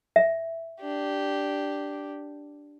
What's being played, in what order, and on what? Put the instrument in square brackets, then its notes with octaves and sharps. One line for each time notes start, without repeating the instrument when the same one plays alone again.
[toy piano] E5
[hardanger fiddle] D4 G4